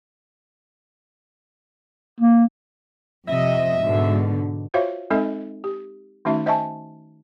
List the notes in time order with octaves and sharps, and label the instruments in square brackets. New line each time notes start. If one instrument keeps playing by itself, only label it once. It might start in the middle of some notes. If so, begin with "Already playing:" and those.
[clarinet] A#3
[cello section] F2 C3 D#5 [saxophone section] E5
[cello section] G#2 B2 D3
[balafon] F4 F#4 C5 C#5 E5 F5
G#3 C4 D#4 A4 D#5 E5
G4
D#3 A3 C#4 D#4 F#4 E5
C5 D#5 E5 G#5 A5 C#6